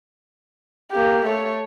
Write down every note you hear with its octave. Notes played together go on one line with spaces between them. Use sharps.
A#3 G4
A3 C#5